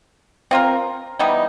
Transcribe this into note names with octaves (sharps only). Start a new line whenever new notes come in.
C4 F4 A#4
E3 G3 B3 D#4